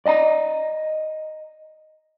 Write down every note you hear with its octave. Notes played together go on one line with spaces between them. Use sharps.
D5 D#5 A5 A#5